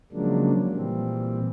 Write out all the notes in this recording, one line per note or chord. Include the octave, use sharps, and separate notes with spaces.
C#3 F3 F#3 G#3 A#3 D4
A#2 E3 G3 C4